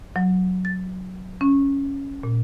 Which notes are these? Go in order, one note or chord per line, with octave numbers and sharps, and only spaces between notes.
F#3
A6
C#4
A#2